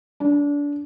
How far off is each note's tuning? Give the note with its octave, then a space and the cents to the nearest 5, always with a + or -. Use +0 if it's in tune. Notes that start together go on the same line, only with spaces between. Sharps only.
D4 -25